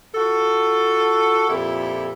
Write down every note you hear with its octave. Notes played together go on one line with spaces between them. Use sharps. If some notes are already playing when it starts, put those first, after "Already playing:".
F4 F#4 A4
F2 A#2 E4 G4 A4